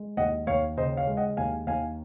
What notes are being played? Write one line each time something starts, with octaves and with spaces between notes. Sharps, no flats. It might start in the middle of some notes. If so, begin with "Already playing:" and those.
Already playing: G#3
D#2 D#5 F#5
D#2 C#5 F5
C#3 C5 D#5
C#5 F5
G#3
D#5 F#5
D#2 F5 G#5
D#2 F5 G#5